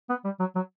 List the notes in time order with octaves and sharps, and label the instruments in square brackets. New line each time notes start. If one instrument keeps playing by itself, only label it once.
[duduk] B3
G3
F#3
F#3